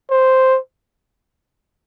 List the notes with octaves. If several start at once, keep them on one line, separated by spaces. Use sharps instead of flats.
C5